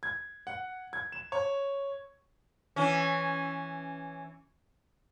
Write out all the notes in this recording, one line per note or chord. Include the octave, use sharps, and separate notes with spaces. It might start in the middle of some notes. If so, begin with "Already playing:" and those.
G#6
F#5
G#6
E7
C#5
E3 C#4